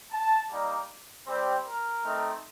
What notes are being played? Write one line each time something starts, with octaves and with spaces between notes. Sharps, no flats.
A5
G3 A#3 D#4 D5
G3 C4 G4 C5
A#4
A3 C4 D#4